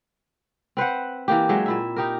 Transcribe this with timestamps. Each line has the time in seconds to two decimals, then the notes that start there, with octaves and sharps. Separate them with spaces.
0.77 C4 B4 C5 F#5
1.28 E3 A#3 G4
1.49 F#3 G#3 E5 G5
1.66 A#2 E4 E5
1.96 D#4 G4 A#4